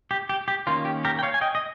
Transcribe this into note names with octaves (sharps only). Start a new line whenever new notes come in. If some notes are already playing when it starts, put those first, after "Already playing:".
G4
G4
G4
D#3 A#3 C#4 F4
G4
G4 A#4
G5
C#5 F5
G#5
D#5 G5
D#5